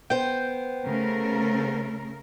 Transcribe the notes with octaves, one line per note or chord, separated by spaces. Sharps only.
B3 C5 G5
C#3 A3 A#4